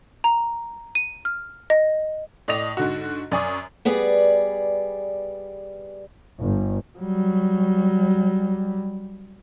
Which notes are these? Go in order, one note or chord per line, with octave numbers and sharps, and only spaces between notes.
A#5
D#7
F6
D#5
A2 D5 D#5 D#6 A#6 F7
G#2 D3 F#4
F#2 D5 G#5 C#6 D#6
G3 B3 G#4 D5
G1
F#3 G3